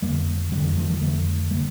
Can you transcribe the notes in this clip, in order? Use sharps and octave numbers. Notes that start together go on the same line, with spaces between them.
F2 D3 G3 A#3
F2 D3 D#3 G3
D#3 G3
F3 A3
D#3 G3
F2 D3 F3 A3
D3 G3 A#3